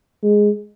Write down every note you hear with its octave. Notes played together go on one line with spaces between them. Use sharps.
G#3